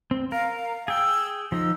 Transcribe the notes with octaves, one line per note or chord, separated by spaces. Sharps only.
C4
A#4 F5
G#4 G5 E6
F3 D#4 E6